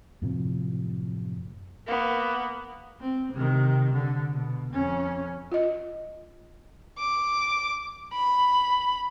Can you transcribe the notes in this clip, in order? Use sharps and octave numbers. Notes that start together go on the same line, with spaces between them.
F#2 A2 C3 F3
A#3 B3
C4
C3 D#3
D3
B2
F2 C#4
F4 D#5
D6
B5